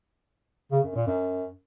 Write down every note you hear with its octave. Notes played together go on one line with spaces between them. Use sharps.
C#3
F#2
A#2
F#2